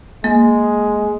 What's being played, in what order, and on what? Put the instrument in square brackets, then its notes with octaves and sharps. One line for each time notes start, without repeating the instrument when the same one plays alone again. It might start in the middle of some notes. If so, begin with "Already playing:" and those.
[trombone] G#3 [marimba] A#3